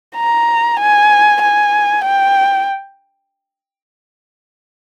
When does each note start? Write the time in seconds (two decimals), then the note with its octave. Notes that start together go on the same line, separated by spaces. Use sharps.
0.16 A#5
0.80 G#5
1.42 G#5
2.05 G5